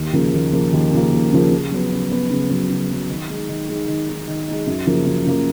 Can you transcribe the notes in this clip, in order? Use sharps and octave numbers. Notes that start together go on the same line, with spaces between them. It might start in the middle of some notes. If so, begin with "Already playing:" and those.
Already playing: D#2
C#3 F3 A#3
D#2
C#3 F3 A#3
D#2
C#3 F3 A#3
D#2
C#3 F3 A#3
C#3
F#3 B3
C#3
F#3 B3
C#3
F#3 B3
C#3
F#3 B3
D#3
G#3 D#4
D#3
G#3 D#4
D#3
G#3 D#4
D#3
G#3 D#4
F#2
C#3 F3 A#3
F#2
C#3 F3 A#3